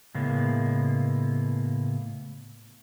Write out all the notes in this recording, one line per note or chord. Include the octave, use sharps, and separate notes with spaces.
A2 C#3 G#3 A#3 B3